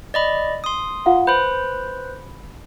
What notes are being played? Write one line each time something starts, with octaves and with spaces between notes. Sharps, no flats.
D5 D#5 B5
C6 D#6
F4 F5 F#5
B4 C5 B5 G6